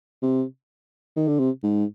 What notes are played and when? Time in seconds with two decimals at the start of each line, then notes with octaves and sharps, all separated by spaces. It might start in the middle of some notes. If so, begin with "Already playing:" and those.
0.22 C3
1.16 D#3
1.28 D3
1.39 C3
1.63 G#2